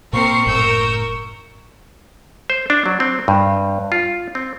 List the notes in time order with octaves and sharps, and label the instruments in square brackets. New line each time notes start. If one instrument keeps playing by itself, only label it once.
[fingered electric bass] A#2 A#3 [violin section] C4 A#4 C7 [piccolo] C#6
[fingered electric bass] F#1 A2 [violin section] A#4 E6 G6
[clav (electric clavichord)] C5
D4
F#3
C4
G2
F4
C4